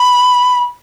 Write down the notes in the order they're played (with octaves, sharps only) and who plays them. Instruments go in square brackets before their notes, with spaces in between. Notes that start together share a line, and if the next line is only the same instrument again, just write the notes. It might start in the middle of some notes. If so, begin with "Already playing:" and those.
Already playing: [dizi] B5